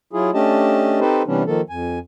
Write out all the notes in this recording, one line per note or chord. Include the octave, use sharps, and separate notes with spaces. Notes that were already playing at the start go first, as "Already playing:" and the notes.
F#3 E4 F4 G#4
A3 C#4 D4 G4 D#5 A5
C4 D#4 G4 A4 B4 C5
C3 E3 G3 B3 C#4 D4
D#3 F3 A#3 A4
F2 G#5